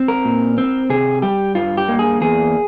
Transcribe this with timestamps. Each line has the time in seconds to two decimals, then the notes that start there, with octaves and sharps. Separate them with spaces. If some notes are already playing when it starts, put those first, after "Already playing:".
Already playing: C4
0.08 A#4
0.25 A#2
0.58 C4
0.90 C3 G#4
1.22 G3 G4
1.55 G2 F4
1.77 G4
1.88 A#3
1.99 G#4
2.21 E2 G#4